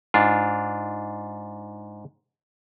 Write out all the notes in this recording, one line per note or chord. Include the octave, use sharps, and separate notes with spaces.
G#2 D4 F4